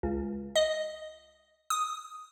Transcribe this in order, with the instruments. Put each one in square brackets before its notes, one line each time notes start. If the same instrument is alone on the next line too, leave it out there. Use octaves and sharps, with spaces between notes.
[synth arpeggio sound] C#2
D#5
D#6